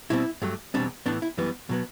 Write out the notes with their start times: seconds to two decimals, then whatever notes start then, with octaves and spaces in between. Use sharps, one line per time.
0.10 B2 G3 C4 E4
0.42 G2 F#3 A3
0.74 E2 B2 G3 C4 D4
1.06 A2 E3 B3 D4
1.22 E4
1.38 F#2 E3 G3 B3
1.69 B2 F#3 B3